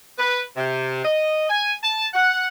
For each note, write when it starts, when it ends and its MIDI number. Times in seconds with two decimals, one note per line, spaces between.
0.18 0.41 71
0.56 1.03 48
1.04 1.46 75
1.49 1.73 80
1.82 2.05 81
2.13 2.47 78